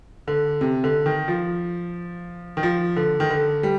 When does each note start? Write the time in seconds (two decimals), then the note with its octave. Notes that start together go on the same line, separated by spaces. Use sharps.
0.28 D3
0.61 C3
0.84 D3
1.06 D#3
1.28 F3
2.57 D#3
2.63 F3
2.96 D3
3.20 D#3
3.30 D3
3.63 G3